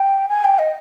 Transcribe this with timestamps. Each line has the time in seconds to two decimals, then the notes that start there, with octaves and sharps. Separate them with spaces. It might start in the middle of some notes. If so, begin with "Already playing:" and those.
Already playing: G5
0.29 G#5
0.44 G5
0.59 D#5